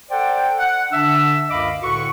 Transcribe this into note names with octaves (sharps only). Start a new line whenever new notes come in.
A4 C5 D5 F#5 G5
F#5
D3 D4 E5 E6
C#2 F#2 D#5 F5 B5 D6
C2 A2 D3 F#4 B4 C#6